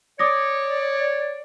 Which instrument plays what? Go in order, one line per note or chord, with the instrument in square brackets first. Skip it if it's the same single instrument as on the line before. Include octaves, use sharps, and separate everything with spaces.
[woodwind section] C#5 D5 [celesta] D6 D#6 A#6